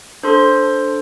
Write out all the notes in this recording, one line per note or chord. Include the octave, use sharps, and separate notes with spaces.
D4 A4 C5 C6